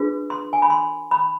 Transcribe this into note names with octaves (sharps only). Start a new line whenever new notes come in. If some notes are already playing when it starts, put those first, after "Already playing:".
Already playing: D4 F4 G#4 B4
C6
G#5
B5
C6
B5